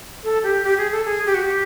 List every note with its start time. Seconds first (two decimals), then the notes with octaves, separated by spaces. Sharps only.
0.24 A4
0.43 G4
0.64 G4
0.78 G#4
0.92 A4
1.05 G#4
1.26 G4
1.34 F#4
1.43 G4